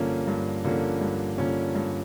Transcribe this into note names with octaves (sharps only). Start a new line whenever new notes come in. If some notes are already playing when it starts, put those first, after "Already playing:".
Already playing: G2 D3 F3 A#3 C#4
G2
D3 F3 A#3 C#4
G2
D3 F3 A#3 C#4
G2